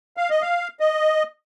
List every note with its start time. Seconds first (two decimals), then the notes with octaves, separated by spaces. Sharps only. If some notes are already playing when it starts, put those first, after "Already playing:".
0.17 F5
0.30 D#5
0.42 F5
0.80 D#5